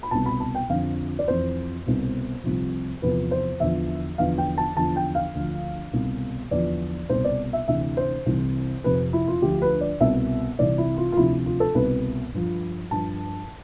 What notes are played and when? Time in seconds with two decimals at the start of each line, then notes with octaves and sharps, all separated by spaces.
0.03 B5
0.11 C2 B2 A5
0.26 B5
0.40 A5
0.55 G5
0.69 F2 D3 F3 F5
1.19 D5
1.28 F2 E3 C5
1.86 C2 B2
2.44 C2 C3 F3
3.02 E2 C3 F3 B4
3.31 C5
3.60 E2 D3 F3 E5
4.18 E2 D3 F3 F5
4.38 G5
4.58 A5
4.77 E2 D3 F3 A5
4.96 G5
5.15 F5
5.35 D2 D3 F3
5.93 C2 B2
6.51 E2 D3 F3 D5
7.09 C2 B2 C5
7.24 D5
7.53 E5
7.68 D2 C3 E3 E5
7.97 C5
8.26 C2 C3 E3
8.84 F2 C3 F3 B4
9.13 E4
9.28 F4
9.42 D2 D3 F3 G4
9.62 B4
9.81 D5
10.00 C2 B2 E5
10.59 C2 C3 E3 D5
10.78 E4
10.97 F4
11.12 F4
11.17 D2 C3 F3 E4
11.46 F4
11.60 A4
11.75 C2 B2 B4
12.34 G2 F3
12.91 G2 F3 A5